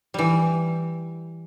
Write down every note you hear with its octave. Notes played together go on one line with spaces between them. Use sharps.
E3 G3